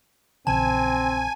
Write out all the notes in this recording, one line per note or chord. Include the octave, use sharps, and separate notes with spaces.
A#1 C#3 E3 C4 G#5 A5